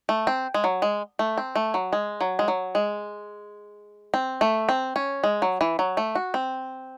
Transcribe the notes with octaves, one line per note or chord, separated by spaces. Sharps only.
A3
C4
G#3
F#3
G#3
A3
C4
A3
F#3
G#3
F#3
G#3
F#3
G#3
C4
A3
C4
C#4
G#3
F#3
E3
F#3
A3
F#4
C4